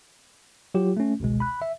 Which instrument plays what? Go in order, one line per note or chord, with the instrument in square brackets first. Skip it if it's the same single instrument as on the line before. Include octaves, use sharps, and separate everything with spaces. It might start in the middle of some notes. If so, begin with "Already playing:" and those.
[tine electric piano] F#3 F4 G4
A3 C#4
G#1 C#2 B2 G#3
B5 F#6
E5